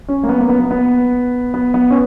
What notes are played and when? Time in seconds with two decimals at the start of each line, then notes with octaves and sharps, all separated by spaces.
0.08 C#4
0.23 A#3
0.29 B3
0.39 A#3
0.49 B3
0.60 B3
0.71 B3
1.54 B3
1.74 B3
1.90 C#4